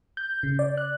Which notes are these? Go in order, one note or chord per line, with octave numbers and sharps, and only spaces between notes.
G6
C#3
D5
F#6